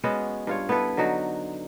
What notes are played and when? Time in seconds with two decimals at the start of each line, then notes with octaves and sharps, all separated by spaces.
0.04 G#3 B3 C#4 F#4
0.47 G2 F4 C#5
0.69 B3 E4 A4 B4
0.97 D3 F#3 D#4 F#4